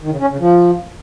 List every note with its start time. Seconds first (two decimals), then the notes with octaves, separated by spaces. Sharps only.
0.01 D#3
0.10 C#3
0.20 C#4
0.30 C#3
0.40 F3